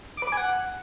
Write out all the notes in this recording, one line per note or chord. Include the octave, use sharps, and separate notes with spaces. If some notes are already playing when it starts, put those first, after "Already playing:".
D6
B4
D6
G#5
F#5